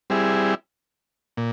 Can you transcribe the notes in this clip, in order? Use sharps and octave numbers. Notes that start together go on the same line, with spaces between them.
G3 C4 E4 G#4
A#2